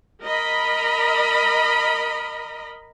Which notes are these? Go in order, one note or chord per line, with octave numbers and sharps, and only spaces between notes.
A#4 D#5 B5